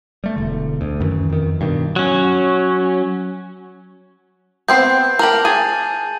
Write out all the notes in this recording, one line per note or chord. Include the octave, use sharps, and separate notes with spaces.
G3 A3
E1 D3
D2
F#2 D#3 E3
F2 D#3
G2 B2 D#3
F#3 C#4
B3 C4 C5 G6 C7
G4 A#4 A5 F7 F#7
G#4 G#5 A6 D#7